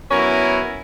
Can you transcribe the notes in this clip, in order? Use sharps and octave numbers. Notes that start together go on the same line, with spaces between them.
F#3 B3 C#4 E4 A#4